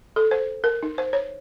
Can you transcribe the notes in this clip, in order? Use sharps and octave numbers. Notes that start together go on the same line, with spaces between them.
A4
C5
A#4
D#4
C5
C#5